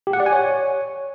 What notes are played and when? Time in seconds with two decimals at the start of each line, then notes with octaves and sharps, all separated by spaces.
0.07 G4
0.13 F#5
0.20 D5
0.26 G#5
0.33 C#5